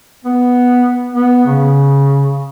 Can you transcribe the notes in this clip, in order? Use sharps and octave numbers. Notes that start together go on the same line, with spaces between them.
B3
B3
C#3